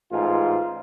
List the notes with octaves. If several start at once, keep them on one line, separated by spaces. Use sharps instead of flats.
A1 G#2 F4